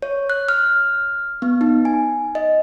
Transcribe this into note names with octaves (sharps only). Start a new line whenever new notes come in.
C#5
F#6
F6
B3
D#4
G#5
D#5